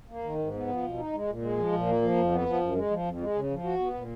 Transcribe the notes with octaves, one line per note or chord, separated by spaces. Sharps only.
A#3
D#3
G#2
B3
F3
B2
D#4
G#3
A#2
G#3
F3
A#2
A#3
F3
F2
B3
F3
F#2
G#3
F3
F2
G#3
C#3
F3
F#4
B3
A#2